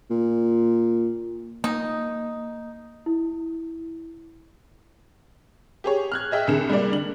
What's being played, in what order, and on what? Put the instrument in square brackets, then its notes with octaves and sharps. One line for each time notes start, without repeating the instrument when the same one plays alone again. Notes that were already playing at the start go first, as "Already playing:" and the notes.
[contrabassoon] A#2
[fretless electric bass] A#3 [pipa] D#4
[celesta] E4
[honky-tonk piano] G4 G#4 C#5
F6 F#6 G#6
G#4 D#5 E5 G5
C2 D3 G#4 E7
G3 G#3 A#3 D5
D3 F#7